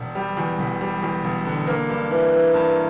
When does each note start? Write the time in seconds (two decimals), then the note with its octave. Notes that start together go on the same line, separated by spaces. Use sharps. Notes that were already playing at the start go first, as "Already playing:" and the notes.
Already playing: E1
0.15 G3
0.37 E2
0.59 E1
0.81 G3
1.02 E2
1.24 E1
1.45 D3
1.67 A#3
1.89 G2
2.11 E3
2.33 E3
2.54 G2